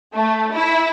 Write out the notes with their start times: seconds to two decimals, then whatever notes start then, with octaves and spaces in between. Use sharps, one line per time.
0.14 A3
0.52 E4